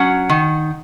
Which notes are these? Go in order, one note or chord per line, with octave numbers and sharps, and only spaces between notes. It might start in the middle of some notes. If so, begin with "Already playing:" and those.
Already playing: F#3 C#4 F#5
D#3